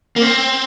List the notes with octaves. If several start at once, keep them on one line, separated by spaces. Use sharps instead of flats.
A#3
C4